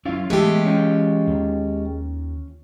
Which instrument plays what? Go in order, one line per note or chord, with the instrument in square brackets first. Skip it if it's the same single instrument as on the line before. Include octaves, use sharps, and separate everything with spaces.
[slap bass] F#3 C#4 [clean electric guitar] E4 F4 F5
[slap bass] E3 [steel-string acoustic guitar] G#3 G4 [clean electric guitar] A3 B3 E5
[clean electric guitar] C#4 F4 G5
[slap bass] D#2 D#3